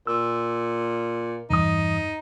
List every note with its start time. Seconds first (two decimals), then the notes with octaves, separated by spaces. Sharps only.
0.07 A#2 E6
1.50 E2 G2 D#4 D#6